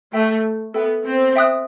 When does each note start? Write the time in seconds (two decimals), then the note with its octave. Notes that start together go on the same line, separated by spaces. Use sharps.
0.13 A3 A4 E5 G5
0.74 B3 A4 E5 G5
1.04 C4
1.36 E5 G5 D#6 F#6